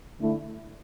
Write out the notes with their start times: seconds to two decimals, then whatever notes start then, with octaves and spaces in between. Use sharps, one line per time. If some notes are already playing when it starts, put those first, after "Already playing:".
0.20 D3 A3 E4